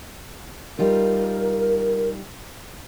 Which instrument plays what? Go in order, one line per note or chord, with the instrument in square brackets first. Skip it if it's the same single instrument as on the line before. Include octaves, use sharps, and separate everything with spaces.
[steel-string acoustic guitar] G3 D#4 F4 [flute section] A#4